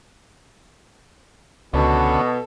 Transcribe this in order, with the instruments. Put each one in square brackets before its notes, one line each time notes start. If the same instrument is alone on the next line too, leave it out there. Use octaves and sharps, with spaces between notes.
[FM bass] C#2 [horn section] B2 [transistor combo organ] D3 B3 C#4 [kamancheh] A4